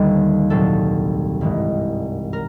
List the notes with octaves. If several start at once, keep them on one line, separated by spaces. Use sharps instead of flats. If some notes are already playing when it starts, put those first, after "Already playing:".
Already playing: D#2 D3 G3 A4
C2 A#2 F#3 A4
G#1 G2 E3 G#3
A#4